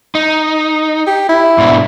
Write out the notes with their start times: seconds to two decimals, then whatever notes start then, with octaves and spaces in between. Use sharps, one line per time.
0.15 D#4
1.07 G4
1.29 E4
1.58 G#2 B2 D4